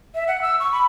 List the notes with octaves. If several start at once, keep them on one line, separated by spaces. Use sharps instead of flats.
E5
F#5
E6
C#6
B5